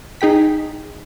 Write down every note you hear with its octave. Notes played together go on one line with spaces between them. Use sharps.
D#4 G#4 G5 B6